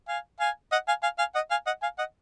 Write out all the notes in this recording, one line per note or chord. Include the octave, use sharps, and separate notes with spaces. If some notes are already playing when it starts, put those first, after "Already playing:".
F5 G#5
F5 G#5
D#5 F#5
F5 G#5
F5 G#5
F5 G#5
D#5 F#5
F5 G#5
D#5 F#5
F5 G#5
D#5 F#5